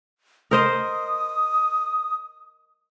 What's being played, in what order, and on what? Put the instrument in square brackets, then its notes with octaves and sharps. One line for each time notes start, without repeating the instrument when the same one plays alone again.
[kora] A#4 C5 D#5 [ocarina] D#6